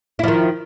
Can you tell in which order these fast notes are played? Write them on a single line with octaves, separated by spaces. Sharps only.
E4 F3 D#3